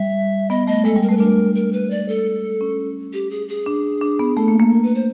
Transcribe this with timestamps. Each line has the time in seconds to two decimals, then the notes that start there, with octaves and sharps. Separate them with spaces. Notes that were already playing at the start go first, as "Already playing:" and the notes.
Already playing: G3 E5
0.50 B3 D#5
0.67 A3 D#5
0.85 G#3 A4
0.96 G3
1.02 A#4
1.09 A3 B4
1.17 D4 A#4
1.55 A#4
1.73 B4
1.90 D5
2.08 A4
2.61 C#4
3.13 G4
3.31 G#4
3.48 G#4
3.66 D4
4.01 D4
4.19 B3
4.37 A3 A4
4.48 A#3
4.60 A#3
4.72 A#4
4.83 B4
4.95 C5